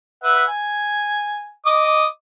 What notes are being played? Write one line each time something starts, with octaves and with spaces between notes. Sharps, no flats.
B4 E5 F#5
G#5
D#5 D6 D#6